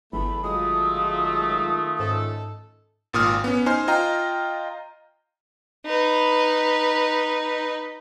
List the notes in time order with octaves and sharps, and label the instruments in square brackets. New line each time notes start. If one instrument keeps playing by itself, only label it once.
[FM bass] G1 [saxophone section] E2 A3 [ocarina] B5
[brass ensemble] D#3 A3 F4 [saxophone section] F#3 G#3 [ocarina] D#6
[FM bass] G#2 [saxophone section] C#4 D#4 A4
[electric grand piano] G#1 A#2 D#6 F6
B3 C#4
D#4 C5 G#5 C6 F6
F4 D#5 G5 A#5 F6
[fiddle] D#4 B4